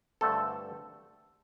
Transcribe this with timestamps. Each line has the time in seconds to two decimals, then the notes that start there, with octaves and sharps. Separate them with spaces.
0.21 G2 D3 A3 C4 A4